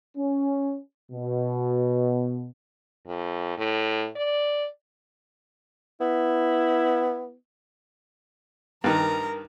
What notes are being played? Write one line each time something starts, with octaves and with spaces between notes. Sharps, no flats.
C#4
B2
F2
A2
D5
B3 E4
G2 D#3 A#4 A#5